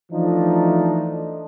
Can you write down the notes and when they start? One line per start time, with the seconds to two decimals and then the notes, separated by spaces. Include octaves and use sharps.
0.12 E3 F3 A3 D4 D#4